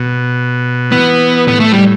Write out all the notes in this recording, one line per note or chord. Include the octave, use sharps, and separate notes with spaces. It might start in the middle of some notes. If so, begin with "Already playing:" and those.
Already playing: B2
E3 B3
A2 B3
A3
G3